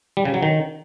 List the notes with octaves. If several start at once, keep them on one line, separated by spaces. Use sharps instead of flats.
G3
C#3
F#3
D#3